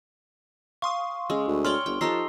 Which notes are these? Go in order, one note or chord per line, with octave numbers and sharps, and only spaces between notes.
F5 C6 C#6 D#6
C#3 G#3 E6
D2
C#5 D5 G5 C6 F6 G7
G1 G5
F3 D#4 G4 A4 A#5 E6 C7